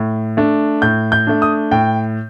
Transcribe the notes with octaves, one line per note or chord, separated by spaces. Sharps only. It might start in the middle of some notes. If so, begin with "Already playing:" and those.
Already playing: A2
A3 D4
A2 G6
G6
A3 D4
D#6
A2 G5